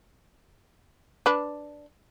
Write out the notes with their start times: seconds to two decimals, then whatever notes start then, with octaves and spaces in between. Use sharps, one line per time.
1.26 D4 B4